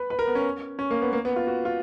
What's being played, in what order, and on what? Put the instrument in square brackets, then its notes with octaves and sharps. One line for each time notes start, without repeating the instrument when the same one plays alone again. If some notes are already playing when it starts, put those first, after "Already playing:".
Already playing: [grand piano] B4
B4
A#4
B3
C#4
C#4
A#3
B3
A#3
B3
F4
F#4
F4